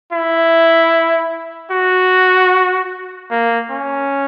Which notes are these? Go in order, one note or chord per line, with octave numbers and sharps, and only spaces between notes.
E4
F#4
A#3
C#4